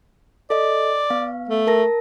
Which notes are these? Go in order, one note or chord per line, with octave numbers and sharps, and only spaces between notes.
A4 D5 D#5
B3 F5
A3
A#4 A5 A#6